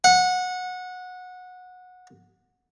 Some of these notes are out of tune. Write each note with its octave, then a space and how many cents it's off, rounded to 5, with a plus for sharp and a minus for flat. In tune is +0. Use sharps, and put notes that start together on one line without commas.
F#5 -20